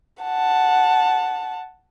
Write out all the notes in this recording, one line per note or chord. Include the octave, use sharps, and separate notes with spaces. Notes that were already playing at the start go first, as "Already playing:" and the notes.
F#5 A5